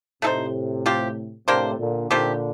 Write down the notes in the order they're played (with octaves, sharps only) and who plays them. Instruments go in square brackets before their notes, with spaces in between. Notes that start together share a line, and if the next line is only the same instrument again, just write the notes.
[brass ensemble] A2 C3 [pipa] A3 D#4 A4 C5
[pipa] F3 C4 G4
[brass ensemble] A2 C3 [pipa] A#3 D4 G4 C5
[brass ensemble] A#2 D3
[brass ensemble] A#2 D3 [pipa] D#3 A3 C4 G4